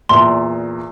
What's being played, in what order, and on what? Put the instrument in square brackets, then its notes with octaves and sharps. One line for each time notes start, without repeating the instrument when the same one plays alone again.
[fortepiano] E2 A#2 [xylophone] C6